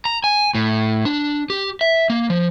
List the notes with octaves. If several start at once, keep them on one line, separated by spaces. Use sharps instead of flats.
A#5
G#5
A2
D4
G4
E5
A#3
F3